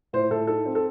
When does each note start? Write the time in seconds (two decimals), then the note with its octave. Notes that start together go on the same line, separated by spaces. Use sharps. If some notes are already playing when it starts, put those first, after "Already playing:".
0.13 A2 C5
0.30 A2 A4
0.47 D#4 A4
0.65 C4
0.75 A4